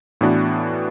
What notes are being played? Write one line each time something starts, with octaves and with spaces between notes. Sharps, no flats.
A2 E3 B3 D4 F#4